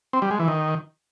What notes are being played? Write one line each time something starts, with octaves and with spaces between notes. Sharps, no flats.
C4
G3
G#3
E3
D#3